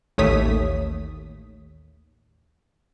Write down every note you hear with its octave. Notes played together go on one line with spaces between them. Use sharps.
A1 D#2 A3 C#5 D#6 B6